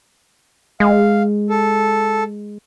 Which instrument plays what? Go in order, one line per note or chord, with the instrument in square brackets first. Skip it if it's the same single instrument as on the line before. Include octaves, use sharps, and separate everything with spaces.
[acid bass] G#3 [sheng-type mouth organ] F5
[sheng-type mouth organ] A4